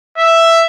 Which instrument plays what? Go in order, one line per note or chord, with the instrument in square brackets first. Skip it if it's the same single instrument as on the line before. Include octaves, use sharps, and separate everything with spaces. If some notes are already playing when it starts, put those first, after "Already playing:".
[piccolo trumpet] E5